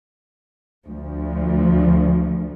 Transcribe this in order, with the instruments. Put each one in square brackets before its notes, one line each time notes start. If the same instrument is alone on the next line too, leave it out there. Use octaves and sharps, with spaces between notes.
[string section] D2 F3